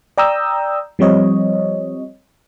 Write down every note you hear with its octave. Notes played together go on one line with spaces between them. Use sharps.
D5 G5 A#5 D#6 E6 G6
F3 G3 C4 C#5 D#5